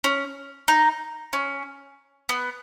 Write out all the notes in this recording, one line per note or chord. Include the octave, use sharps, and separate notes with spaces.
C#4
D#4
C#4
B3